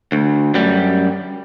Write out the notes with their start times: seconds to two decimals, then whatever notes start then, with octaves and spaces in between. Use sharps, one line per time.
0.12 D2
0.54 F#2 G3